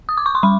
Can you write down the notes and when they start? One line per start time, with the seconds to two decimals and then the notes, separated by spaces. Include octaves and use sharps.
0.09 D#6
0.17 D6
0.26 C#6
0.35 C6
0.43 G3 B5